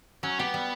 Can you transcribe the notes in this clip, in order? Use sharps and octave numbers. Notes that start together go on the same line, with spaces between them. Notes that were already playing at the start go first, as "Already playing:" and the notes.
F#3 C#4
B3 G4
G3